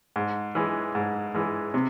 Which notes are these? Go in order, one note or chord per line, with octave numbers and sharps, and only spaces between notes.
G#2
E3 G#3
G#2
E3 G#3
C3